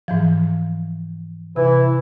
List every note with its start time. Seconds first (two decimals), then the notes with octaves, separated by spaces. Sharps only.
0.08 G#2 E3 F3
1.56 C3 E3 E4